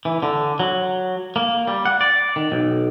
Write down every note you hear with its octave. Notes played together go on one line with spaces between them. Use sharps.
E3
D3
F#3
A#3
G3
F#5
D5
D#3
B1